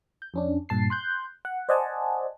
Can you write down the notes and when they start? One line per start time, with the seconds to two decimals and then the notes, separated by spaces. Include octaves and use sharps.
0.22 G6
0.34 F2 C#4 D4
0.69 G2 A#2 A5 C7
0.90 C6 F#6 G6
1.45 F#5
1.69 C5 D5 D#5 F#5 G#5 A5